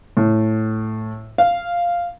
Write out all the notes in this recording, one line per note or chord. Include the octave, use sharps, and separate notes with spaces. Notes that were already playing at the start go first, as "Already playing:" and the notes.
A2
F5